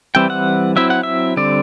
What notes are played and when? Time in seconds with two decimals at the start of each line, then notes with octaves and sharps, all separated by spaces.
0.15 E3 G3 C4 E4 G5
0.30 F#5
0.76 F#3 C4 E4 E5
0.90 F#5
1.03 E5
1.37 D3 G3 C4 D5